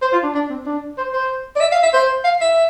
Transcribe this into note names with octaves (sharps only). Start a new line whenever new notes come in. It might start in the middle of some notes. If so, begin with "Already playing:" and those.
C5
F4
D4
D4
C4
D4
C5
C5
D5
E5
F5
E5
C5
F5
E5